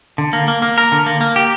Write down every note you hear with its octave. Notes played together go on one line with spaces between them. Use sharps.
D3
A#3
A#3
A#3
A#4
D3
A#3
A#3
G4